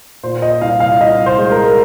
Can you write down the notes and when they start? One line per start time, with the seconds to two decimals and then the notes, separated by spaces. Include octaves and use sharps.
0.23 A#2 C5
0.42 D#5
0.61 C2 F5
0.80 F5
1.00 C2 D#5
1.26 C5
1.39 G#3
1.52 A#4